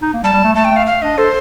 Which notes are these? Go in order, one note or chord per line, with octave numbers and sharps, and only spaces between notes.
D#4
A#3
G3 A5
G3
A3
A3 A5
G5
A3
F5
F5
D4 D#5
A4 C5